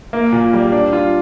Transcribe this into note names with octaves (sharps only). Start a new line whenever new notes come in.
A#3
A#2
G3
D4
F4